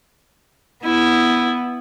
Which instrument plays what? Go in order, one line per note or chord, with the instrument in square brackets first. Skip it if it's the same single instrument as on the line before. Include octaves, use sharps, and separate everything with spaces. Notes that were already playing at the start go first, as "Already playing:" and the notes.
[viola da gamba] B3 [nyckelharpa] E4